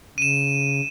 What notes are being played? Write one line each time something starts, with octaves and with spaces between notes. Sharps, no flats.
C#3 D#7 E7